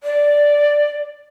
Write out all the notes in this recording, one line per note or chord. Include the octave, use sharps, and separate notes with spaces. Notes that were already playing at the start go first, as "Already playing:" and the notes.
D5